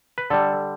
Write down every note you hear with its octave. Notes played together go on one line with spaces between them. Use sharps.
B4
D3 G3 A4